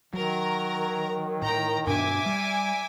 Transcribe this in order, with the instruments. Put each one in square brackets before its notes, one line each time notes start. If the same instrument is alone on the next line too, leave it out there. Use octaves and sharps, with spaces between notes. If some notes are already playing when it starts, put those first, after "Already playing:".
[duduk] D#3 [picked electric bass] F#3 [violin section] A#4 A#5
[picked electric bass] A2 [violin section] G5 A#5
[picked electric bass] G2 B2 D4 [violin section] E5 G#5 D6
[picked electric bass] G3